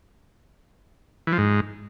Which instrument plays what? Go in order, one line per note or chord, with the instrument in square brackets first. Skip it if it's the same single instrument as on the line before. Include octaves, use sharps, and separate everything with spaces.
[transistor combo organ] E3
F3
G#2